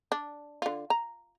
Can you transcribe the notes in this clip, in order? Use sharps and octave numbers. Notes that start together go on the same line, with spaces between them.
D4
D3 F4
A#5